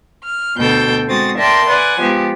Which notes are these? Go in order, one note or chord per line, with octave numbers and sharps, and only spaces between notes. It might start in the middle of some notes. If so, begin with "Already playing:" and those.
F6
D2 B2 A4 G5 G6
G#3 C4 F#4 D#6 A6
A#4 D5 E5 G5 A5 C6
B4 D5 F#5 G#5
F3 G#3 B3 G4